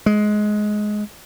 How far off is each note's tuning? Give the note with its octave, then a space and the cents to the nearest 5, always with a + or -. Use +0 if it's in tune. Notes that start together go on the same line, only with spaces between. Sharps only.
G#3 +15